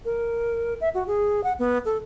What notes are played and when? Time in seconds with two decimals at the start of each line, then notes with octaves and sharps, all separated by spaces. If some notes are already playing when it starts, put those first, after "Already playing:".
0.05 A#4
0.81 E5
0.94 F#4
1.07 G#4
1.44 F#5
1.59 B3
1.85 A4